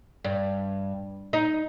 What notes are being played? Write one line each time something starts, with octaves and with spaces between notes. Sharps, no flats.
G2
D#4